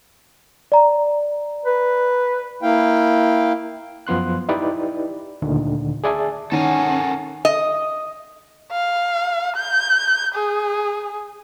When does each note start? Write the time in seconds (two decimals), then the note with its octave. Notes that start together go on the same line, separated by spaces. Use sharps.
0.72 D5 A#5
1.65 B4
2.63 A#3 E4 F5 G5
4.07 F#2 F3 B3 C6 F#6
4.49 D#4 E4 G4 B4 D5
5.42 D2 A#2 D3 D#3
6.04 G#4 D5 E5 G#5 A5
6.52 D#3 C#4 A4 A#4 C#5 F#5 G#5
7.45 D#5
8.72 F5
9.57 G6
10.35 G#4